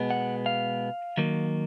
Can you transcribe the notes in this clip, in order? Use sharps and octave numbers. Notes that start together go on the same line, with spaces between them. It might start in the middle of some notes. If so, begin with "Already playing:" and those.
Already playing: B2 G#3 B3
F#5
F5
D#3 F#3 A#3